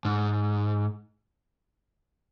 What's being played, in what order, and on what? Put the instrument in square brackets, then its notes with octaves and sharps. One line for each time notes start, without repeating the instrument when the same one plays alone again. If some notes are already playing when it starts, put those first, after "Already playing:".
[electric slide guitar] G#2